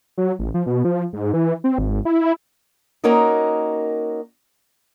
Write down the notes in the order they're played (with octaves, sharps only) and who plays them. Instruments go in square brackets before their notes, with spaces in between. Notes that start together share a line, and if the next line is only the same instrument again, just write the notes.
[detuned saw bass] F#3
A1
F3
B2
F3
G#2
E3
C4
G#1
E4
[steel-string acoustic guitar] A#3 C#4 D#4 F#4 A#4 D#5